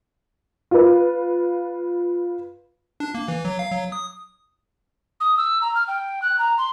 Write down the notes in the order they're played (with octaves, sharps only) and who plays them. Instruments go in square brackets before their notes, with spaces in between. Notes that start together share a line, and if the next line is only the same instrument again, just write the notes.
[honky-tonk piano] F4 B4
[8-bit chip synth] D4
A#3
E3
F#3
F5
F#3
D#6
[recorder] D#6
E6
A#5
F6
G5
F#6
A#5
C6